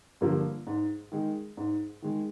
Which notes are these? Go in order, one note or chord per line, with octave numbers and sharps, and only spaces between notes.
G2 D3 F3 A#3
G#2
D#3 G#3
G#2
D#3 G#3